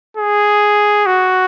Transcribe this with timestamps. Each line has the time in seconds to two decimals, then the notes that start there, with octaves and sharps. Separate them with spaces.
0.17 G#4
1.06 F#4